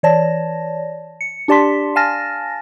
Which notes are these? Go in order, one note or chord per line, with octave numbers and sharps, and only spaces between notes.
E3 C#5 D5 A5 A#6
C#7
D4 G4 D5 A5 C6 B6
F5 G#5 A5 F6 A6 A#6